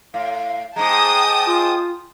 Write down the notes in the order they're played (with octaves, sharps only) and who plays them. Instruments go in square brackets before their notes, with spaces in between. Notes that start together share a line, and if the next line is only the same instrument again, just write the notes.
[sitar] A2 [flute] F5
[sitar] G#2 G#3 [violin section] G5 A5 D#6 [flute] A#5
[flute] F4